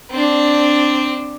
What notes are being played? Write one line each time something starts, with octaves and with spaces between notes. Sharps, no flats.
C4 D4